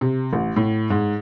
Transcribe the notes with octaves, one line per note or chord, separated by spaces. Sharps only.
C3
A1
A2
G#2